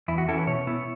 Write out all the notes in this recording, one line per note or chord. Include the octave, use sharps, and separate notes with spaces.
E2 E4
F#4
E3 C#4 E4 A4
B4
B2 C#5
B3 E4